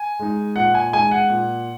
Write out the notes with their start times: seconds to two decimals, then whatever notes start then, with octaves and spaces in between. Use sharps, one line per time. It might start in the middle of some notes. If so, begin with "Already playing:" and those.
Already playing: G#5
0.19 G#3 D#4
0.56 A#2 F#5
0.75 G#5
0.93 G#3 D#4 G#5
1.11 F#5
1.30 A#2